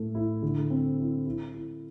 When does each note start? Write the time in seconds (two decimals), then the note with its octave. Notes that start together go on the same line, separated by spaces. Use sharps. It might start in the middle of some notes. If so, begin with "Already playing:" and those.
Already playing: A2 A3
0.15 E4
0.42 D3
0.70 C4
0.98 E4
1.26 E4
1.54 E4